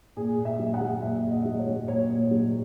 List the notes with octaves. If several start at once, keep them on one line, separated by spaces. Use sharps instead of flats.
A#2 G#4
A#2
E5
F#3
F#5
F#3
A#2 E5
A#2
D#5
F#3
C#5
F#3
A#2 C#5
A#2
F#3